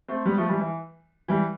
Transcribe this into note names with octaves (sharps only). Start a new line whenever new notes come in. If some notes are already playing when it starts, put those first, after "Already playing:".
A3 C4
G3 B3
F3 A3
E3 G3
E3
E3 G3